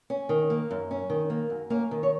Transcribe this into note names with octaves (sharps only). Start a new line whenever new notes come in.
C#4
D#3
A#3
F#2
C#4
D#3
A#3
F#2
A#3 C#4 A#4
D#3
C#5